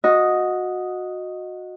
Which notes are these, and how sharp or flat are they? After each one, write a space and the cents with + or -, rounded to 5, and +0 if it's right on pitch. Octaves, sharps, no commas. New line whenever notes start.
F#4 -20 D#5 +0